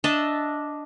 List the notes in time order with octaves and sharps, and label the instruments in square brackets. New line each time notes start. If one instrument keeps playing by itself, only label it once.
[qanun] D4 D#5 E5 A5